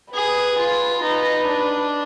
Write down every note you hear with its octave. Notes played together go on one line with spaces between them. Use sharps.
G#4 B4
F4
D#4 B4
D4